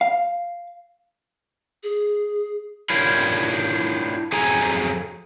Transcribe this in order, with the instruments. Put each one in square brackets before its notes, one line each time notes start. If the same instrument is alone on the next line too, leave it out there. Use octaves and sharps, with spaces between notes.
[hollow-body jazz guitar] F5
[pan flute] G#4
[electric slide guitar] D4 E4 F4 G4 A#4 C#5
F2 F#3 G#4 A4 G#5 A#5